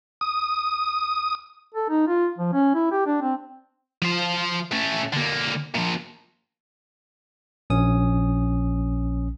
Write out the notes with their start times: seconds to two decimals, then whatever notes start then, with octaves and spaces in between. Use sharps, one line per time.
0.21 D#6
1.74 A4
1.90 D#4
2.07 F4
2.38 F3
2.53 C#4
2.74 E4
2.91 G4
3.06 D4
3.22 C4
4.02 F3 C5
4.71 A3 C#4
5.13 D3 A#3
5.74 A#2 F3
7.70 A#1 C#4 D#6